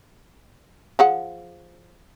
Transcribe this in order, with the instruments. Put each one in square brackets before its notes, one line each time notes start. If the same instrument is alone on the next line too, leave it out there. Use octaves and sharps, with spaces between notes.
[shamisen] F3 G#4 F#5